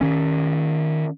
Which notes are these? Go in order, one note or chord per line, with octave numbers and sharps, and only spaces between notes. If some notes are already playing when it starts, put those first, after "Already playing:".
D#3 C#4